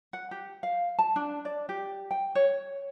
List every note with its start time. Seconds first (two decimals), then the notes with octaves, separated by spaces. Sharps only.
0.13 F#5
0.31 G4
0.63 F5
0.99 A5
1.16 D4
1.45 D5
1.69 G4
2.11 G5
2.35 C#5